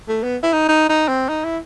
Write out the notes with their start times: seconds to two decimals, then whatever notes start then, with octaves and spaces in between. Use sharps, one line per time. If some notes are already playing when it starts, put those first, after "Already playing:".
0.08 A3
0.23 B3
0.43 E4
0.53 D#4
0.68 D#4
0.89 D#4
1.08 C4
1.29 D#4
1.44 E4